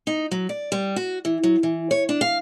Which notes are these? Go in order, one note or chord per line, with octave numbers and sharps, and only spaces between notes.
D#4
F#3
D5
G3
F#4
E3
F#3
E3
C#5
D4
F5